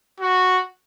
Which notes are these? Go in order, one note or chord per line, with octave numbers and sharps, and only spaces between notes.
F#4